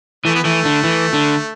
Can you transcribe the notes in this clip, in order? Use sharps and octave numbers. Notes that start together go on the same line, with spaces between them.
E3 A3
B3
E3 A3
D3
E3
D3